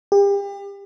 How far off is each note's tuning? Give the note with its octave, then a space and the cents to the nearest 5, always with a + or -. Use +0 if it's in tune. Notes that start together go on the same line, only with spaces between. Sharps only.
G4 +35